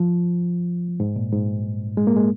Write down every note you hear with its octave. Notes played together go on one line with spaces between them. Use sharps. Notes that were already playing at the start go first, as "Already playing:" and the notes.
Already playing: F3
G#2
A#2
G#2
G#3
A#3
G#3